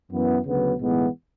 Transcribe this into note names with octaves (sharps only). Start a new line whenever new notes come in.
F#2 E3 B3
D2 C#3 F#3 B3
B1 A2 E3 G#3 B3